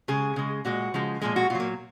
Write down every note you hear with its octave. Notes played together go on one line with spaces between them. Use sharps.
C#3 G#3 G#4
C#3 G#3
A#2 G#3 F#4
C#3 F3 G#3
A#2 F3 G#3 G#4
F#4
A#2 F#3 F4
A#3